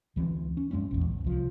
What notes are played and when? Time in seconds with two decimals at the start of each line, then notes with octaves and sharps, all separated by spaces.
0.16 D2 E3 B3 C4
0.57 C#4
0.71 G2 G#3 C4 C#4
0.91 A#1 E2
1.05 D1
1.24 C2 F3